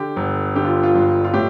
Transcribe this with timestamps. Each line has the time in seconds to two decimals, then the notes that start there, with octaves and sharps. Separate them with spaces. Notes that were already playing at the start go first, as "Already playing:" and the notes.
Already playing: D3 G4
0.16 G1
0.55 D3 G4
0.65 F4
0.83 F4
0.95 G2
1.24 F4
1.33 A2 G4